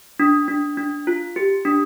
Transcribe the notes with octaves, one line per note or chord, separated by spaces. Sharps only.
D4
D4
D4
F4
G4
D4